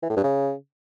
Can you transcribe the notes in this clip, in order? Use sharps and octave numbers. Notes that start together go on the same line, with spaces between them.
E3
A2
G2
C#3